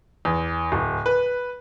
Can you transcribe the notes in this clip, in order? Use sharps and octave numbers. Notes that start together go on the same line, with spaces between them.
E2
D1
B4